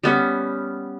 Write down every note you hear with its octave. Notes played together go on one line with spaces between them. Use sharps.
G3 B3 C#4